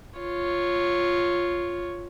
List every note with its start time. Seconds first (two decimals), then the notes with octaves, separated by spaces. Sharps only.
0.19 F4 C#5